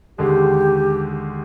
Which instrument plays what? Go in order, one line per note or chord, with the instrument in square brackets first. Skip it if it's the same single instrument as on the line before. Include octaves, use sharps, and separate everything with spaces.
[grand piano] D#2 D3 G#3 [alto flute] G4